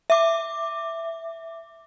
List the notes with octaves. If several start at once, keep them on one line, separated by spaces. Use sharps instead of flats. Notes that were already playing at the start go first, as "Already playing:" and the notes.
E5 D6